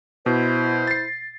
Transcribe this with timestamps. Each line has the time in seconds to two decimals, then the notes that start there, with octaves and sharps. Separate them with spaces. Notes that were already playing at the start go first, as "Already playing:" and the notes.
0.26 B2 E4 C5
0.87 A6 C7